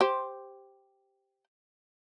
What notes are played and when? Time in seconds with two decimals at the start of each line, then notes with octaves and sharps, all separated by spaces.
0.01 G4 C5